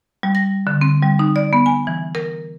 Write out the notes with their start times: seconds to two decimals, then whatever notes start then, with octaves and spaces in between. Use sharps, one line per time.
0.23 G3
0.35 A#6
0.67 D3
0.81 C4
1.02 G3
1.19 D#4
1.36 D5
1.53 B3
1.66 G#5
1.87 E3
2.15 A#4